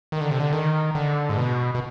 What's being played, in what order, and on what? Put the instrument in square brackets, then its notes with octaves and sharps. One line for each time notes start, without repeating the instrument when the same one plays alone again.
[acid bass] D#3
D3
C3
D3
D#3
D3
G#2
B2
B2